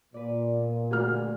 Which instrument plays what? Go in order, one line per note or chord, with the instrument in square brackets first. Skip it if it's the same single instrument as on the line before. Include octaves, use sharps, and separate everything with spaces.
[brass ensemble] A#2 [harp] B4 D5
[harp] B3
[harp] D3 A3 G#4 [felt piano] F#4 F6